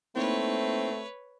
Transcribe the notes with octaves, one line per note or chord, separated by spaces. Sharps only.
A3 A#3 C4 D#4 E4 B4 C#5